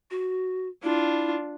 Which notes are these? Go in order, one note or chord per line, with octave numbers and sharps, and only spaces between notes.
F#4
D4 E4 F4